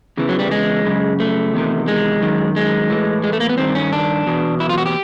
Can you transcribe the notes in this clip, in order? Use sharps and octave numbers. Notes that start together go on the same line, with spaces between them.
E2 C#3 E3
F#3
G3
G#3
F#2 C#3
A3
E2 C3 D#3
G#3
F#2 D#3
G#3
A2 E3
G#3
A3
A#3
B3
G2 D#3 C4
C#4
D4
E2 B2
E4
F4
F#4
G4